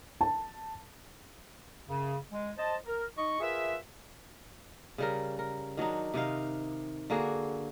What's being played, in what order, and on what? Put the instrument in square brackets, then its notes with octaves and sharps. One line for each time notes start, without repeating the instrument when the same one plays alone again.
[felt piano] A5
[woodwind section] F#2 C#3
G#3
C5 D#5 A5
A#4
D#4 D#5 C#6
F4 G#4 A#4 B4 E5
[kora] C#3 G3 A#4
A#4
D#3 F#3 D4 D#4
C3 D#3 D#4 F5
D3 A#3 F#4 G#4